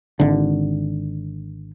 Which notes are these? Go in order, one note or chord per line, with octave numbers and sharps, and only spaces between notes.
G#1 D3